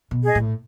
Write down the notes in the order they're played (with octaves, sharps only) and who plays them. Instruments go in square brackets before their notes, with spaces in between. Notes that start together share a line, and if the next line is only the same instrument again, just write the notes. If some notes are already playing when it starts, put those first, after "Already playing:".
[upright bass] B2
[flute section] G#4 D#5
[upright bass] A2